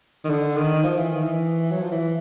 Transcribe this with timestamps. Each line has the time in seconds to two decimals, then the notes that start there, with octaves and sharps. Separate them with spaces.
0.24 D#3
0.29 D3
0.57 D#3
0.83 F3
0.97 E3
1.10 D#3
1.24 E3
1.72 F#3
1.82 F3
1.92 E3